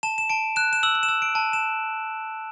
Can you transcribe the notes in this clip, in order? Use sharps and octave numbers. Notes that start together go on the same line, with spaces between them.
A5 E7
E7
A5 D7
F#6 E7
E7
E6 F#7
F#7
E7
E6
D7
A5
E7